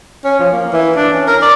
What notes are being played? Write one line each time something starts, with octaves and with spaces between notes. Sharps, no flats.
C#4
F3
A#3
E3
D4
C#4
A#4
D5